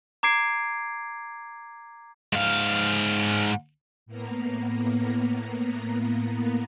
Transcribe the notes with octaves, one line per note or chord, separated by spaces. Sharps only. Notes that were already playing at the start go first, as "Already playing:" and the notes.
A#5 D6 G#6 C7 D7
G#2 F5
A2 A#3 B3 A#5